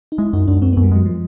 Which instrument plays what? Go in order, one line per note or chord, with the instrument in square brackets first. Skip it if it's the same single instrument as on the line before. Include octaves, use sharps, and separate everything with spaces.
[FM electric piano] D#4
[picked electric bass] G#3 [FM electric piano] E4
[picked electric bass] F#2 [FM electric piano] D#4
[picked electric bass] F#2 [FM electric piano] D4
[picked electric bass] F#2 [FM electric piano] C4
[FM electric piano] B3
[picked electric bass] F#2
[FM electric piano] G3
[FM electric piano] F#3 [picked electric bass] G#3
[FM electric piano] F3